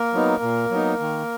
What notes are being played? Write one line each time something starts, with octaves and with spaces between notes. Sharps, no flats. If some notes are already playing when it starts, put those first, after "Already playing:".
Already playing: A#3 A#4
F#3 B3 D#4
A#2
F#3 B3 D#4
D#3